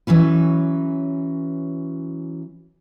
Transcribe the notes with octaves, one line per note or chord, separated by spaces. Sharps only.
E3 F#3 C#4 B4